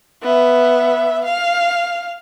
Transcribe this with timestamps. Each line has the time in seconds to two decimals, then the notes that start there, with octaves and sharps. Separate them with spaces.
0.22 B3 E5
1.24 F5